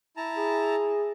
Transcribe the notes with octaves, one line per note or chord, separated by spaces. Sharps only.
E4 A5 A#5
G#4